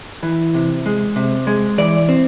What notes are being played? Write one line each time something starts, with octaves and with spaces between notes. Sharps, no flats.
E3
C3
G#3
C3
G#3
E3 D5
C4